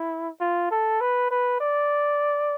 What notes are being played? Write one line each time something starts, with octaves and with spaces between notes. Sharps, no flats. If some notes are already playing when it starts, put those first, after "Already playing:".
Already playing: E4
F4
A4
B4
B4
D5